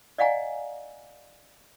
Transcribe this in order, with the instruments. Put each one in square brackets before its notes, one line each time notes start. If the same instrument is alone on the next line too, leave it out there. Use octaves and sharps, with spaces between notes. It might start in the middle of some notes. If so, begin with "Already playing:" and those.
[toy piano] D5 D#5 F5 F#5 G#5 A#5